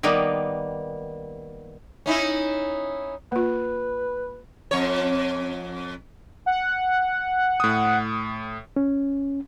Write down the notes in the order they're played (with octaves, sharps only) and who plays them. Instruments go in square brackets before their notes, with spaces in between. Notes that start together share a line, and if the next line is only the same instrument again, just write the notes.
[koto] D#3 G3 A#3 B3
[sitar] C#4 D#4 E4
[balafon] A#3 F4 [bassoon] B4
[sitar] F2 C#5
[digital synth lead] F#5
[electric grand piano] A2 D#6
[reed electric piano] C#4